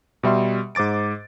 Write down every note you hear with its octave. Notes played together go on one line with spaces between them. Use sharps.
B2 G3 E5 C6
G#2 C5 D6 A6 D7